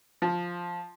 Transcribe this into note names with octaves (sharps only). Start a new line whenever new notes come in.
F3